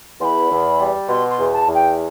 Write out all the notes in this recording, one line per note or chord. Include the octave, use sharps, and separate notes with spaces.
E2 B5 C6
E2
G3
B2 C6
C6
E2
A5
E2
G5